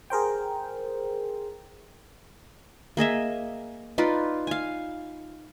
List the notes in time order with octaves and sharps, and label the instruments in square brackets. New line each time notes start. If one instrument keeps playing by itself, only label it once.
[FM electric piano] G#4 A#4 C5 G5
[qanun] A#3 G#4 D#5 E5
D#4 F4 B4 D5
F5 G#5